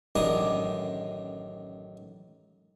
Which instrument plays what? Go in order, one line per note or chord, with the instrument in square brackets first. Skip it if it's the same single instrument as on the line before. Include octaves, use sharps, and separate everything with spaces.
[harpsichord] A1 F#2 D#3 D4 G#4 D#6